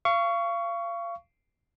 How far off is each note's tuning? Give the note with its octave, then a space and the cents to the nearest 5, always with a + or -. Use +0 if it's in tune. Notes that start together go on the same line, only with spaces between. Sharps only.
F5 -30 C#6 +15